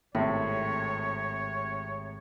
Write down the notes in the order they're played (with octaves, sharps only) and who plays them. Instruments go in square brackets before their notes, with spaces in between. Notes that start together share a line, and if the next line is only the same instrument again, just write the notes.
[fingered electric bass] G#1 [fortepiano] A2 C3 [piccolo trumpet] C#5